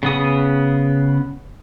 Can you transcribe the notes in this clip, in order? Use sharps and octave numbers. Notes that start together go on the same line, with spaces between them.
C#3 B3 D#6